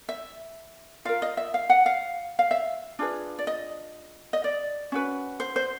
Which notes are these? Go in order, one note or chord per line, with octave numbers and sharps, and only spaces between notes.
E5
F4 A#4 F5
D#5
E5
F5
F#5
F5
F5
E5
D4 F4 G#4 B4
D5
D#5
D#5
D5
C#4 F#4 B4
C5
C5